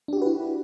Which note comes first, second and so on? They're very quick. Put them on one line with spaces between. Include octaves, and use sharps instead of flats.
D4 G4 F#4 B4 E4